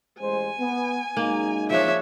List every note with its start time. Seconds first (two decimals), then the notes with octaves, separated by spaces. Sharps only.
0.20 A1 G#3 C5 G#5
0.59 B3
1.17 F#2 G#3 A#3 D#4
1.70 F3 D4 G#4 C#5 E5